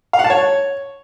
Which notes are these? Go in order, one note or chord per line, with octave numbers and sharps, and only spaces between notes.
F5
F#5
A5
C#5